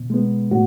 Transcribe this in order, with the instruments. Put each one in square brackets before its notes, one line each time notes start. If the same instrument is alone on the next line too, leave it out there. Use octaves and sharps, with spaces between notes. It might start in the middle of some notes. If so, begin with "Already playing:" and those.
Already playing: [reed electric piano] B2
G#3 B3
A2 F#4